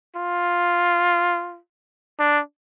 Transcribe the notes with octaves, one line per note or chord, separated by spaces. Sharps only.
F4
D4